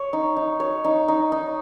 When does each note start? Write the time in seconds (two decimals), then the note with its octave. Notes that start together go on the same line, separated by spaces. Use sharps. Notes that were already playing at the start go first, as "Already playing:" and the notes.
Already playing: C#5
0.13 D#4
0.36 D#4
0.60 C#5
0.84 D#4
1.08 D#4
1.32 D#4